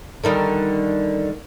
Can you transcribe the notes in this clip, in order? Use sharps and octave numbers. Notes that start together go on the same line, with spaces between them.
D3 D#3 G3